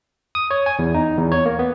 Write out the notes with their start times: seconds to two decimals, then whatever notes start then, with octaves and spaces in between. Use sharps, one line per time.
0.35 D#6
0.51 C#5
0.66 G#5
0.79 E2
0.94 D#4
1.18 E2
1.32 C#5
1.46 A#3
1.59 B3